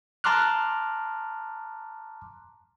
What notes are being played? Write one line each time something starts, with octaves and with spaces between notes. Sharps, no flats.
A5 A#5 C6 D6 F6 F#6